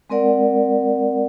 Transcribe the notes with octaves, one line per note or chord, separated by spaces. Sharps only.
G#3 C4 A#4 D5 F#5